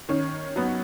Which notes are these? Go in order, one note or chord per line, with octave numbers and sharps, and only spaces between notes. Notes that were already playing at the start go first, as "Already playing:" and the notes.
D#3 C#4
F#3 B3